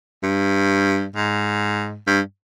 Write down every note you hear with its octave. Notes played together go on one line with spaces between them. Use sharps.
G2
G#2
G2